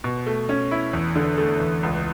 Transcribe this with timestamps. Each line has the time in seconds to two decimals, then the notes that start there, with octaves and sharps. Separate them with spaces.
0.04 B2
0.26 A3
0.49 C#4
0.71 E4
0.93 E2
1.16 D3
1.38 A3
1.60 E2
1.83 C#2